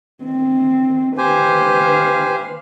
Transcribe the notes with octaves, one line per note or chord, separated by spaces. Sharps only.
C4
G4 B4 C5 F5 G#5